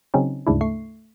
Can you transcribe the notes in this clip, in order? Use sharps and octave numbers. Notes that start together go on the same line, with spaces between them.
C#3 F#3 C4 C#4 D#4
D2 G#2 C#3 D4 E4
A3 C#6 C7